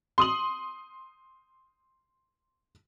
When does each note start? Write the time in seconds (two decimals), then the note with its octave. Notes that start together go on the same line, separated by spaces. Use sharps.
0.18 C6 D#6 F#7